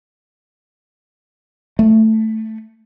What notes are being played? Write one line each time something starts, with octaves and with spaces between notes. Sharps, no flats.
A3